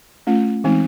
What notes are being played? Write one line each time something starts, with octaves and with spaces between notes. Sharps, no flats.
A3 C#4 F4
E3 G#3 C4 D#4